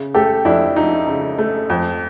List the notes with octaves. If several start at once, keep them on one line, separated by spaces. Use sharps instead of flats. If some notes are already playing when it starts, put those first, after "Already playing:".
Already playing: C#3
A3 G4 A4
F2 D4 E4
F3 D#4
C#3
A3
F2